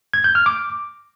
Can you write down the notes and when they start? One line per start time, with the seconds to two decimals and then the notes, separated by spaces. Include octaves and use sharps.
0.14 G#6
0.24 G6
0.35 F6
0.46 D6